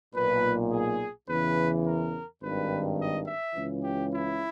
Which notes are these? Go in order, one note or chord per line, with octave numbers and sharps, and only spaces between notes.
B1 A#2 B4
G#4
E2 C#3 E3 B4
A#4
G#1 G2 D#3 B4
D#5
E5
C#2 C#3 E3
G4
E4